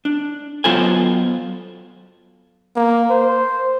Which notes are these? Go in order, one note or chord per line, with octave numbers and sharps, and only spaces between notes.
D4
F#3 B3 F4 A4 C5 G#5
A#3
C5